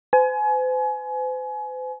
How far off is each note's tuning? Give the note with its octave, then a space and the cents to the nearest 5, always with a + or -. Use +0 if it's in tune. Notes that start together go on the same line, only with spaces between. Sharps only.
C5 -45 G#5 +30